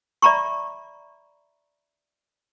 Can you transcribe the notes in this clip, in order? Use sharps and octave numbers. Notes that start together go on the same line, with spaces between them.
D5 E5 A#5 B5 C#6